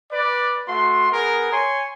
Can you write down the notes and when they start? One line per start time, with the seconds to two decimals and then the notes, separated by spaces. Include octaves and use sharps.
0.12 B4 D5
0.68 A3 F#4 C6
1.12 B3 G#4 A#4
1.52 C#5 G#5 C6